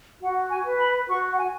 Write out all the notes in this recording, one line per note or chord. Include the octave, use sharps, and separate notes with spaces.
F#4 F#5
G#5
B4
B5
F#4 C#6
F#5
G#5